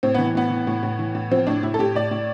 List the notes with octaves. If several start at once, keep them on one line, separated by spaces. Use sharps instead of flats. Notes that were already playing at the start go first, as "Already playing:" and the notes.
A2 C4
E3 B3
A2 B3
E3
A2
A2
E3
A2
F3 C4
A2 D4
A2 E4
A4
A2 G4
A2 D5
A2